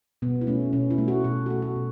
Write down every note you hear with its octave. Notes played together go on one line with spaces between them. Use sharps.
B2 B3
E4
A3 C#4
B2 C#4
E4
A3
F#4
B2 A4
F#4
A3 A4
F#4
B2